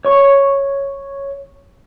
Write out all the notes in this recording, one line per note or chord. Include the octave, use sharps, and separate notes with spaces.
C#5 C#6